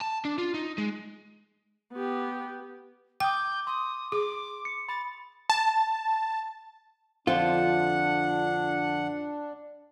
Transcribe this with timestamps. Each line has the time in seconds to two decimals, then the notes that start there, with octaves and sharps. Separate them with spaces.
0.01 A5
0.25 D4
0.38 F4
0.54 D#4
0.78 G#3
1.92 B3 G4
3.20 G5 D6 D#6 G6
3.67 C6 D#6
4.12 G#4 D6
4.65 C#7
4.89 B5 A6
5.50 A5
7.27 F2 D3 F3 D4 F4 F#5